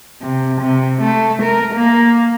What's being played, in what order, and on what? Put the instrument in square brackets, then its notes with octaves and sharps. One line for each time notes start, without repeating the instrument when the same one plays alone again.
[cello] C3
C3
A3
A#4
A#3